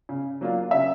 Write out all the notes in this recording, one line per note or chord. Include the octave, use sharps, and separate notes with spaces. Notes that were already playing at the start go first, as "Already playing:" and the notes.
C#3
F#3 A#3 D4 F4
C#3 E5